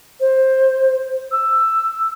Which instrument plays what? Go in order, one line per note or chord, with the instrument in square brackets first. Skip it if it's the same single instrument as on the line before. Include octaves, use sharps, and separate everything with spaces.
[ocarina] C5
E6